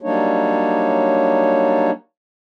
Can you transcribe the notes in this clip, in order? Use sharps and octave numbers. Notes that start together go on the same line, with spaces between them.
F#3 G3 A#3 D4 D#4 C#5